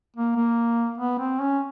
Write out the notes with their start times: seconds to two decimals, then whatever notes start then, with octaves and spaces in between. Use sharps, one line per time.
0.16 A#3
0.36 A#3
0.98 B3
1.19 C4
1.40 C#4